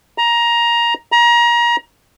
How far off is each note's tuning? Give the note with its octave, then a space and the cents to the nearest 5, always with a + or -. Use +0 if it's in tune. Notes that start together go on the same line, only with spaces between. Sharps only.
A#5 +15
A#5 +30